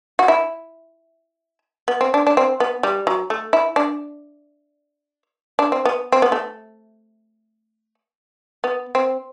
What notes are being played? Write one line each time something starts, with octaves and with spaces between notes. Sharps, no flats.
F#4
E4
B3
C4
D4
D4
C4
B3
G3
F#3
A3
E4
D4
D4
C4
B3
C4
B3
A3
B3
C4